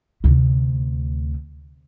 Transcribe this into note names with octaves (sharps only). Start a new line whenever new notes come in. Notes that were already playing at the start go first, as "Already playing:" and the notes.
D2 C3